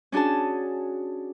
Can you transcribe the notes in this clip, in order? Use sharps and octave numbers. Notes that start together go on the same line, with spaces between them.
C#4 D4 F#4 G#4 A5